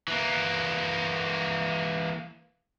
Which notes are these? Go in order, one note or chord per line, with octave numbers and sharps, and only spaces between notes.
E3 A#3